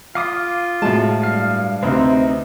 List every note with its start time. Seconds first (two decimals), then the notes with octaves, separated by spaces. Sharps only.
0.15 F4 F5 D6 D#6
0.82 A2 G#3 F#4 A5
1.23 G2 F5
1.83 D2 C3 C4 D#4 B4